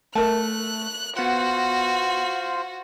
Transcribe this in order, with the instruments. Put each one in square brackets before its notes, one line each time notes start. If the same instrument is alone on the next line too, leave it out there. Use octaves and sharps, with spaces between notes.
[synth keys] A3 [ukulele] A#4 A5 [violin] F#6
[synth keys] B3 F#5 [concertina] F4 C5 [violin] F#4